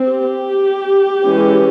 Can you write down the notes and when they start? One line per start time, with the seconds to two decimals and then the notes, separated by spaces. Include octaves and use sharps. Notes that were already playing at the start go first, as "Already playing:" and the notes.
Already playing: C4
0.10 G4
1.24 E3 G#3 C#4